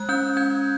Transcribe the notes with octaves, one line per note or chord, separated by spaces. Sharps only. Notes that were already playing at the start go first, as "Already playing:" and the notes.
Already playing: G#3 F#6
C#4 G6
C#4 G#6